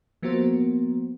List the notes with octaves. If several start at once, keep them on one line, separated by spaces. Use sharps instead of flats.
F3 A#3 B3 F#4 A#4 C5